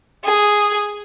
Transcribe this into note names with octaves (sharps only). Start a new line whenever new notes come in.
G#4